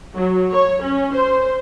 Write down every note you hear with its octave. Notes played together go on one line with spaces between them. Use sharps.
F#3
C#5
C#4
C5